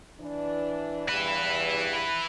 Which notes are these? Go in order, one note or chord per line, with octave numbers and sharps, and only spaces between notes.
E3 D4
E2 G2 E4 B4